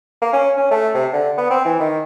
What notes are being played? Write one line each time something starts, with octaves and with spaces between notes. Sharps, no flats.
A#3
C#4
C#4
A3
C3
D3
B3
C4
E3
D#3